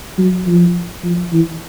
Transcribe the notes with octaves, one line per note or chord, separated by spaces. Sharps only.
F#3
F3
F3
E3